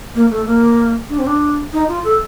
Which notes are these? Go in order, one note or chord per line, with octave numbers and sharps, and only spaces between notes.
A#3
A3
A#3
D4
C4
D4
D#4
F4
A4